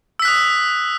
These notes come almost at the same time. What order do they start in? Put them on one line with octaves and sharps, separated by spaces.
E6 B6 F#6 D#6